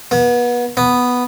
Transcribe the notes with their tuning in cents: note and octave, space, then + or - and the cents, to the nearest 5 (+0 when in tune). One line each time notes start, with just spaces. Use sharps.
B3 -30
B3 +0